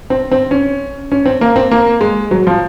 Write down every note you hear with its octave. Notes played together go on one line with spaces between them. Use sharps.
C4
C4
C#4
C#4
C4
A#3
C4
A#3
G#3
F#3
F3